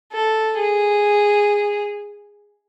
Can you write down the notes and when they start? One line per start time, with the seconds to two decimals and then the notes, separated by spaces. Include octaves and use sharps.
0.13 A4
0.59 G#4